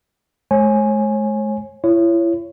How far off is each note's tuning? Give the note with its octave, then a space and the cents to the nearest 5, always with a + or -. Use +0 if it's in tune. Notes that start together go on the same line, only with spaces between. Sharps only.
G#3 +40 C#5 -35 G#5 +0
E4 +35 C#5 +0